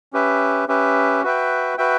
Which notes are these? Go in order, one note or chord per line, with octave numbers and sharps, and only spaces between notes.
C#4 G4 B4 E5
C#4 G4 B4 E5
F#4 B4 E5 G5
F#4 B4 E5 G5